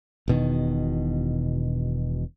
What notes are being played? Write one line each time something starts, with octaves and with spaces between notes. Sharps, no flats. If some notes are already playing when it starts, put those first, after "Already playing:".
E1 B2 D#3